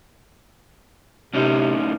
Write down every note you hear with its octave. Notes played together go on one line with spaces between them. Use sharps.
A2 C3 C#4 D#4